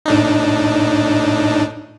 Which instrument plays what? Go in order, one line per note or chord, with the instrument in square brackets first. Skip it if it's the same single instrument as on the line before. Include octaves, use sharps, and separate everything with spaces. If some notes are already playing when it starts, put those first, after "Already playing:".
[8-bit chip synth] A2 D4 D#4